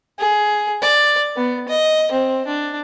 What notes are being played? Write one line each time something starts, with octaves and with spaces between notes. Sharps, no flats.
G#4
D5
B3
D#5
C4
D4